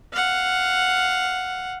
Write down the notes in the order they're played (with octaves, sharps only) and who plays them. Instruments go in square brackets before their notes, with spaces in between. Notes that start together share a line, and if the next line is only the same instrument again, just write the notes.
[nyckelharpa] F5 F#5